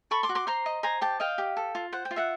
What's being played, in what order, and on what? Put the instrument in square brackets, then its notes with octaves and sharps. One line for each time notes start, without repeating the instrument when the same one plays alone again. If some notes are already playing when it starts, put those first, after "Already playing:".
[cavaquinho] A4 B5 C#6
C6 D6
F#4
C6 D6
C5 A#5 C6
D#5
C5 G#5 A#5
G4 G5 A5
D#5 F5 G5
G4
A4
F4
C5 F#5
G5
F4
E5 F#5